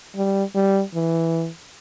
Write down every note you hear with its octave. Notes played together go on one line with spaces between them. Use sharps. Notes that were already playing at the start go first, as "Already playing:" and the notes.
G3
G3
E3